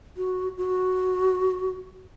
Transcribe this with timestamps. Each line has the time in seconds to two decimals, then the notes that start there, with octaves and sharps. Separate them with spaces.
0.17 F#4
0.58 F#4